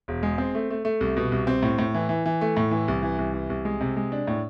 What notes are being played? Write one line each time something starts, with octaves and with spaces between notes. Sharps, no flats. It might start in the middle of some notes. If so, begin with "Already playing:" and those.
E1
G#3
C4
A3
A3
A3
C2
B2
C2
C4
A2
A2
E3
E3
E3
A3
A2
E3
C2
E3
C2
E3
C2
G#3
C3
G#3
D4
A2